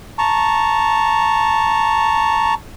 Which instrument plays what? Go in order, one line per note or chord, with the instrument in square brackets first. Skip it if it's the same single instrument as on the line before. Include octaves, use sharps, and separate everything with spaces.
[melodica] A5 A#5 C#6